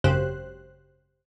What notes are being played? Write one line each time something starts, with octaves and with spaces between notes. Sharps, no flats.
G#1 F#2 C#3 G4 C5 F#6